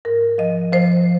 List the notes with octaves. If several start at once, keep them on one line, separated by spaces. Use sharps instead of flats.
G#2 A#4
F3 D#5
F3 C5